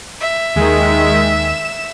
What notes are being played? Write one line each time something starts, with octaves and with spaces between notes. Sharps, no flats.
E5
D#2 D#3 G#3
E7